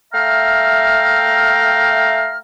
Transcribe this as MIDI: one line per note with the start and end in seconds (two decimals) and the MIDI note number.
0.14 2.39 57
0.14 2.39 76
0.14 2.39 77
0.14 2.39 79
0.14 2.39 82
0.14 2.39 89